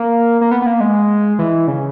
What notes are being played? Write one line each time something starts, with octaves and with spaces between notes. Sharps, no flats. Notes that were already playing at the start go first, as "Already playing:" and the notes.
Already playing: A#3
A#3
B3
B3
A#3
G#3
E3
C#3